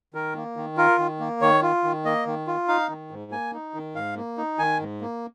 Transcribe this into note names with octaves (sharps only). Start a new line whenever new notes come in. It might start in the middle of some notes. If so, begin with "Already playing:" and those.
D#3 A#4
A#3
D#3
F4 A#4
D#3
A#3
D#3 C#5
F4
D#3
A#3 D#5
D#3
F4
D#4 F5
D#3
G#2
A#3 G#5
D#4
D#3
G#2 F5
A#3
D#4
D#3 G#5
G#2
A#3